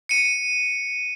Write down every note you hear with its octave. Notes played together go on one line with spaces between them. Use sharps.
C#7 D#7